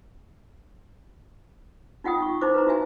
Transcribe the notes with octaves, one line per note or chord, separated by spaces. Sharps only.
D#4 F4 F#5 G5 D#6
C#6
D#4 E4 C5 D6
B4 C5 A#5
E4 F#4 E5 G#5